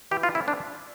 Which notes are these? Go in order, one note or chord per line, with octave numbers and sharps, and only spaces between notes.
E3 G4
F4
A3 C4 E4
D4